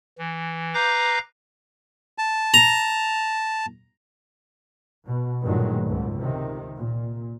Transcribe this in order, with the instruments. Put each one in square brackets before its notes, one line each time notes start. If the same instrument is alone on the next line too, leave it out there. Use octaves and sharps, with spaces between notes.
[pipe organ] E3
B4 F5 A#5 D6 G6 A#6
[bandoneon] A5
[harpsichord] A#5
[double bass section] B2
G2 A#2 D#3 F#3 G#3 A3
C#2 G#2
C3 D#3
A#2